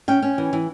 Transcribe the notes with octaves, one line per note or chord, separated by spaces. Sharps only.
C#4 G5
C#4
E3
E3